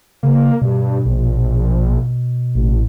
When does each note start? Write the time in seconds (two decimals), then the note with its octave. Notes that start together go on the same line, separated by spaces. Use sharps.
0.23 C#3 A#3
0.61 G2 B2
1.05 A#1
2.55 A1